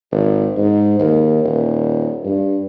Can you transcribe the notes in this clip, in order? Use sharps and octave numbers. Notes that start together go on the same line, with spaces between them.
G#1
G#2
D#2
D#1
G2